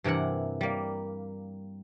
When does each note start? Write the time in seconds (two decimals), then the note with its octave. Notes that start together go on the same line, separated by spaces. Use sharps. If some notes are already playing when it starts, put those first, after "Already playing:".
0.04 G2 C3 E3 A#4 F#5
0.61 G3 A#3